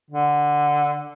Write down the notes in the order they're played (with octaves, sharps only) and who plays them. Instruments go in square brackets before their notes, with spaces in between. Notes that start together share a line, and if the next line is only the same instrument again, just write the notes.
[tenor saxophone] D3